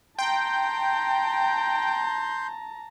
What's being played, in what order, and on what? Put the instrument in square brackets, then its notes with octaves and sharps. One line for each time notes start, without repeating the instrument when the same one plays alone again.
[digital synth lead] G5 [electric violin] A5 A#5 [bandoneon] C6 G6